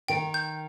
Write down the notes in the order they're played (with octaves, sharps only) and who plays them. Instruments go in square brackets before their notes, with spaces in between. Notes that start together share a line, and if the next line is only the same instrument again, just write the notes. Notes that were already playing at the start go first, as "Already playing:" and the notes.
[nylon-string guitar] D#3 [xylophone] G5
[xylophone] G6